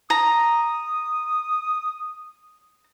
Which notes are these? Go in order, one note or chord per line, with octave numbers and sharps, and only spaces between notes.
A#5 D#6